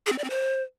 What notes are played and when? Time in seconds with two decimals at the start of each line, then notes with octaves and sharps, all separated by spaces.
0.06 G#4
0.12 C4
0.18 D5
0.24 C4
0.30 C5